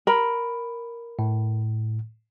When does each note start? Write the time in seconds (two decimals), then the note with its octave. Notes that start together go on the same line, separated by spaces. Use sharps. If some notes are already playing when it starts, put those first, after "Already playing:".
0.07 A#4 B5
1.19 A2